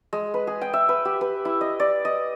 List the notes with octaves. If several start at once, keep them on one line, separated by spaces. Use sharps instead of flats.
G#3
B4
G#4
G5
E5
B4
G4
B4
E4
D#5
D5
D#5